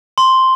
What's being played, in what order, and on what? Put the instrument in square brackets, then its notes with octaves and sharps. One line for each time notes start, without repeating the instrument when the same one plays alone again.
[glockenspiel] C6